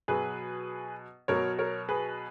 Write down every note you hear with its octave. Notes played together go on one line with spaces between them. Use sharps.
B2 F#3 G#4 B4
B2 F#3 A#4 C#5
A#4 C#5
G#4 B4